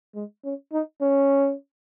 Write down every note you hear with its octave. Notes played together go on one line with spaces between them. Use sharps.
G#3
C#4
D#4
C#4